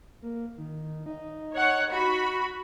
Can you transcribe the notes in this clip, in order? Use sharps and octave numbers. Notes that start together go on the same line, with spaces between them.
A#3
D#3
D#4
C#5 F#5
F#4 B5